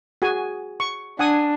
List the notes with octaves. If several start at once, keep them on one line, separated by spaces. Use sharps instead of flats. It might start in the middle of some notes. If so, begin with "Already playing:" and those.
F#4 G#4 G#5
C#6
D4 F#5 G#5 D#6